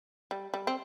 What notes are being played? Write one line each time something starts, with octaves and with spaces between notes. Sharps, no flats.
G3
G3
C4